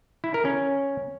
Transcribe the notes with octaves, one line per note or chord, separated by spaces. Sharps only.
E4
A#4
C#4